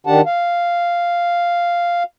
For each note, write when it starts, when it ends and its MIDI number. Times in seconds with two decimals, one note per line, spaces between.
0.07 0.21 51
0.07 0.21 62
0.07 0.21 67
0.07 0.21 78
0.07 0.21 81
0.26 2.03 77